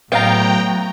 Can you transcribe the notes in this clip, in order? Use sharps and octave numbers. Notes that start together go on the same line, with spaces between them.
A2 F#3 B3 F5 G5 A#5